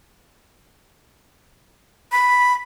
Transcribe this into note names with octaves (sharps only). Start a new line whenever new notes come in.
B5